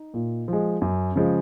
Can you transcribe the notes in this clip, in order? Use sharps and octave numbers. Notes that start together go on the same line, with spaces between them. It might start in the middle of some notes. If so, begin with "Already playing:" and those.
Already playing: D#4
A#2
F3 G#3
F#2
C#3 F3 G#3